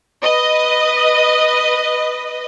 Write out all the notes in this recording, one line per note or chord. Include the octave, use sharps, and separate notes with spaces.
B4 D#5